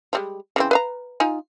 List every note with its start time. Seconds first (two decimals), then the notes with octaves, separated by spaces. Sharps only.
0.13 F3 G3 G#3
0.56 C#3 E3 C4
0.71 B4 F5 A#5
1.20 D#4 F4 G#5